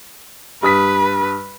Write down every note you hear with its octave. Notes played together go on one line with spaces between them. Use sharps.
G2 B4 D#6 B6